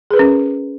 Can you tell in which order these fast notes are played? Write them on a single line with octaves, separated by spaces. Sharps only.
G#4 B4 A#4 C#4